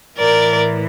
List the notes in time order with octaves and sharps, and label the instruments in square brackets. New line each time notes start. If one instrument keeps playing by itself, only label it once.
[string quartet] A2 E3 A#4 D5